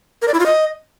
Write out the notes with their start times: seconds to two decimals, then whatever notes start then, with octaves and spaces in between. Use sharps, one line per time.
0.22 A#4
0.28 D5
0.34 E4
0.40 F4
0.46 D#5